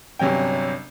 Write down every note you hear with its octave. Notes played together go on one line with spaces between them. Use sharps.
G1 C3 F#3 C#4 G5